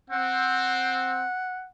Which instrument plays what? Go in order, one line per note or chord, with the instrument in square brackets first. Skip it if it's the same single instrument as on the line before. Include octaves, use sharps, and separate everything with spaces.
[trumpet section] C4 [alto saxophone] F#5